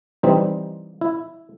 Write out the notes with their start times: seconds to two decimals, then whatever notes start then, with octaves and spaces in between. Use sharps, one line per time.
0.23 E3 G3 C4 D#4
1.01 E4